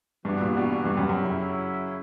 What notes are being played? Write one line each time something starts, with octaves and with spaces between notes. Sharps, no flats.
G2 E3 B3 D4 F#4
A#2
B2
G2
F#2
F#2
C#3 F#3 C#4 E4